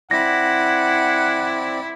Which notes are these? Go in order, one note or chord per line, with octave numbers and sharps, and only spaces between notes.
C4 E4 D5 F#5 A#6